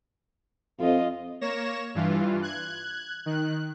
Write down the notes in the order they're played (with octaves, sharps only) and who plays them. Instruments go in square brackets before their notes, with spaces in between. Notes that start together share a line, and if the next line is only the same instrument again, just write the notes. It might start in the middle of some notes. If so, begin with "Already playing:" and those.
[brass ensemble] F2 [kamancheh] F4 D#5
[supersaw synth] A#3 C#5 A#6 E7
G2 E3 F4
F#6 G#6
D#3 F#6